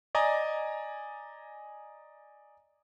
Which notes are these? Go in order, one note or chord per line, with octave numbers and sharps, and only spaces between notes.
D5 D#5 G#5 A#5